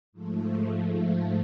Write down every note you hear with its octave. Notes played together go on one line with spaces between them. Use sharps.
G#2 F3 A3